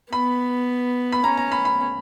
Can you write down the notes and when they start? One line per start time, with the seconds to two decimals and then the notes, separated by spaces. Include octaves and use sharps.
0.12 B3 B5
1.12 B5
1.24 C#4 A#5
1.37 A#5
1.52 B5
1.65 B5